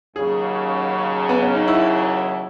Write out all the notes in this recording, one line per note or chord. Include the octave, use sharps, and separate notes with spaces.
D#2 C#3 F#3 G#4
B3
C#4
D#4
E4